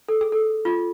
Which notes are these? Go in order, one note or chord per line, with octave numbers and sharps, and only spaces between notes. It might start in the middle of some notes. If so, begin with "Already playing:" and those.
A4
G#4
A4
F4